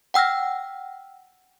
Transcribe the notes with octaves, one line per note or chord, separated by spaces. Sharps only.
F#5 G5 E6 F6 A#6